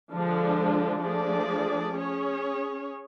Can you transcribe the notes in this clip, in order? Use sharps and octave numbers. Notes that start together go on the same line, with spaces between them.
D3 F3 G#3 D4
F3 A3 D4 G#4 D5
C#4 G#4 C#5